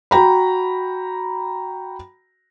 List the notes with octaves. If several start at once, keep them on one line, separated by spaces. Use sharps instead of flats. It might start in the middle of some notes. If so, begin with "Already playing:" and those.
F#4 G5 A#5 B5